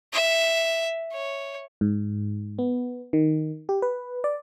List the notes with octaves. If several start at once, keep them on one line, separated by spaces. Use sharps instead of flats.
E5
C#5
G#2
B3
D#3
G4
B4
D5